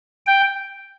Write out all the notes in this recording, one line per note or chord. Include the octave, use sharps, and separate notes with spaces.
G5